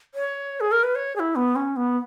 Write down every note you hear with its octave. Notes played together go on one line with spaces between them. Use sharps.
C#5
G#4
A#4
B4
C#5
G#4
E4
B3
C#4
B3